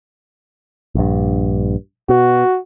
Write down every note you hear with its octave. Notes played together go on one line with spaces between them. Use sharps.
A#1 G2
B2 F#4